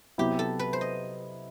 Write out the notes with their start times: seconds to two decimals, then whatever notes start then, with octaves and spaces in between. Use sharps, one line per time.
0.18 C3 F#3 B3 E4 G4
0.39 A4
0.59 B4
0.73 C5
0.81 D#5